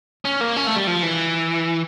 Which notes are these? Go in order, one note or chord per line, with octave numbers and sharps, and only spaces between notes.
C#4
A#3
C#4
A3
G3
F3
E3